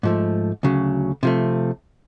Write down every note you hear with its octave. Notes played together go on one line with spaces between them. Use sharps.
G#2 F3 A3
D2 C#3 F#3
C3 F3 A3